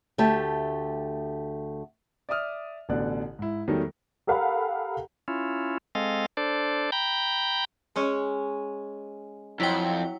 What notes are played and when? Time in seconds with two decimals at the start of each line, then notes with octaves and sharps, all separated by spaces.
0.18 D2 A3 G4 E5 A5
2.29 D5 E5 D6 D#6 F6
2.89 A1 B2 D3 D5 F#6
3.39 G#2 E4
3.67 E2 D#3 F#3 G3 A3 D#4
4.27 G4 A4 A#4 F5 F#5 B5
5.28 C#4 E4 F4
5.95 G#3 C4 A4 D#5 F5
6.37 D4 A4 C5 D5
6.92 G5 A#5 B5 G6
7.96 G#3 C#4 C#5
9.60 F2 F#3 E4 G5